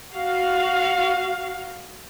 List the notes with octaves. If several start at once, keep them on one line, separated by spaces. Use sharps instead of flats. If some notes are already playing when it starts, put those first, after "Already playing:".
F#4 F5